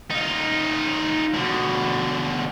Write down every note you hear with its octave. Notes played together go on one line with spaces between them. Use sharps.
D#4 F4
B2 D3